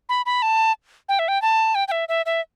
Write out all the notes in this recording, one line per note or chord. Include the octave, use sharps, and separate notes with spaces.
B5
B5
A5
G5
E5
G5
A5
G5
G5
E5
E5
E5